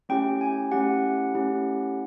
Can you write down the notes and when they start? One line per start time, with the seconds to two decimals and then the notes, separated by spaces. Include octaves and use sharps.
0.09 A3 C#4 E4 G4 G5
0.41 G#5
0.72 A3 C#4 E4 G4 F#5
1.35 A3 C#4 E4 G4